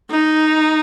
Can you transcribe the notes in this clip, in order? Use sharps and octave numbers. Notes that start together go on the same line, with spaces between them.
D#4